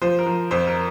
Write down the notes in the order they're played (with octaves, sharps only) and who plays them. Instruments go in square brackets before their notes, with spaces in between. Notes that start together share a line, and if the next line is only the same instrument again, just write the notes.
[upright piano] F3 C5
A#4
F3
F2 C5
A#4